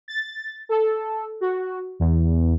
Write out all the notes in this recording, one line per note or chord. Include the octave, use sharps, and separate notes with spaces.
A6
A4
F#4
E2